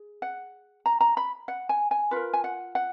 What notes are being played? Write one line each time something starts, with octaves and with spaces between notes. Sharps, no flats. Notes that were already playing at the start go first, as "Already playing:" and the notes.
Already playing: G#4
F#5
A#5
A#5
B5
F#5
G#5
G#5
F4 A#4 B4
G#5
F#5
F#5